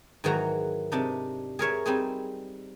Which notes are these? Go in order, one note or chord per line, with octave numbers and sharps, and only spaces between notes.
G#2 D#3 E3 F#3 F#4 A#5
C3 D4 D#4
G#4 A#4 C#5 E5
G3 C4 D#4 G#4